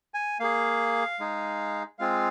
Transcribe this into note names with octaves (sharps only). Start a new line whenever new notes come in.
G#5
A#3 G#4 F5
G#3 D#4 G#4
G#3 C4 F4 G#4 F5